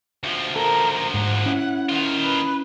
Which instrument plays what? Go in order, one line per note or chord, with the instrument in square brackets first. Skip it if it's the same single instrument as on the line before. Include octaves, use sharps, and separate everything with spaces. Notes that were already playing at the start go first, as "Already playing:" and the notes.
[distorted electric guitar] D2 F3
[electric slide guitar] A4 [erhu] A#4
[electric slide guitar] G#2 [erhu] F#5
[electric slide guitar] C#4 E4
[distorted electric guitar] D#3 F4
[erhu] B4